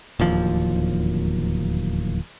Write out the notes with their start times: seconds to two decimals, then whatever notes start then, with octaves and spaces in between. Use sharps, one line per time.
0.19 D1 D#2 F3